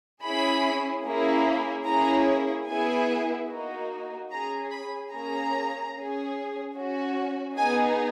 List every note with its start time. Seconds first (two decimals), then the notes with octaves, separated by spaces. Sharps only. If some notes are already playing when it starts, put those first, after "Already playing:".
0.23 C#4 E4 G#4 B5
1.05 A#3 C#4 E4 G#4
1.86 A#3 C#4 E4 G#4 A#5
2.68 B3 E4 G#4 G#5
3.50 A#3 D#4 F#4
4.31 C#4 G#4 A#5
4.72 B5
5.12 A#3 C#4 G#4 A#5
5.94 C#4 G#4
6.75 C#4 F#4
7.57 B3 D#4 G#4 G#5